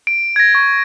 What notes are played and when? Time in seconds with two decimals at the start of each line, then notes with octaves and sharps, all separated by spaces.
0.07 D7
0.36 G#6 A#6
0.55 C#6